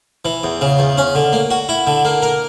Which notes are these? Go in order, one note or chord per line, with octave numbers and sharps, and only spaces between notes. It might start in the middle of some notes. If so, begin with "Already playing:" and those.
E3
E2
C#3
E2
C#4
D3
A#3
F#4
E4
D3
A#3
A#4